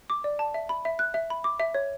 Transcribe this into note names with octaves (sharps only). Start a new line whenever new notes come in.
D6
D5
A5
E5
B5
E5
F#6
E5
B5
D6
E5
C#5